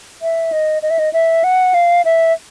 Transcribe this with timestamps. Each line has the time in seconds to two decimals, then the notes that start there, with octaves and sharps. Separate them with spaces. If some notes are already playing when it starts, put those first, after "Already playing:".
0.22 E5
0.52 D#5
0.82 D#5
0.90 E5
0.99 D#5
1.13 E5
1.44 F#5
1.74 F5
2.05 E5